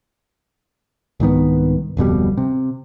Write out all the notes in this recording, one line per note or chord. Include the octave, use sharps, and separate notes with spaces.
C2 G#2 D#3 B3
D1 F2 B2 G3
C3